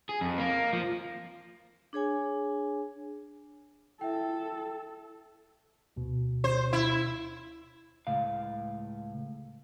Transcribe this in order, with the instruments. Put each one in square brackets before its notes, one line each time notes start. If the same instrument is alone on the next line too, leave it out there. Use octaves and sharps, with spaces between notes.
[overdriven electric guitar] G#4
F2
A#3
F3
[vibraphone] D4 G#4 C#5 G#5
[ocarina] E4 [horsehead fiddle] A4 [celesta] E5 G5
[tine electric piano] D2 B2
[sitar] C5
E4
[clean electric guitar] C#2 A2 F5